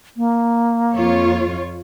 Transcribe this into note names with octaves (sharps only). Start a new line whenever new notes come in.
A#3
F2 F4 C#5